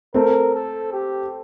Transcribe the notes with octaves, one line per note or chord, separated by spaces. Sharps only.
A3 C4 A#4
A4
G4